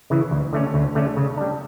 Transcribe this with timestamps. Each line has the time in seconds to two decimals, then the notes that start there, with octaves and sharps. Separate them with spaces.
0.10 C#3 E3
0.31 D2
0.53 D3 A3 C#4
0.74 D2
0.95 D3 A3 C#4
1.16 C#3
1.37 G3 D4